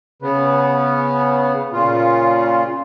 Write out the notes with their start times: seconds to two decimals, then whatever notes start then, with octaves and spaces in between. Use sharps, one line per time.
0.22 C#3 B3
1.73 A#2 C#3 F4